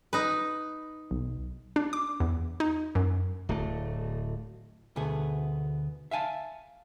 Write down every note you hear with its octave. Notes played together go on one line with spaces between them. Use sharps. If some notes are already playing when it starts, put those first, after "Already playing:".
D#4 B4
B1
D4
D6
E2
D#4
F#2
D1 A3
D2 B2 A3 B3 G#4
E5 F5 G#5 A5